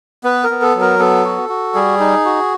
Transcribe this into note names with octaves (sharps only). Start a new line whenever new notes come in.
B3 B4
A#4
B3
A4
F#3
A#4
B3 A4
F#4
F#4
G3 G#4
D#4
F#4